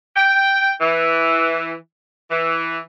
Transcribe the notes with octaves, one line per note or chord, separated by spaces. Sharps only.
G5
E3
E3